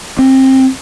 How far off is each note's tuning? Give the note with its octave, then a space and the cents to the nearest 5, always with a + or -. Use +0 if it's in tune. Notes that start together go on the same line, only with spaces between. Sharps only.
C4 +20